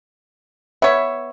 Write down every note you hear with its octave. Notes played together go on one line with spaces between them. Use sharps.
B3 C#5 E5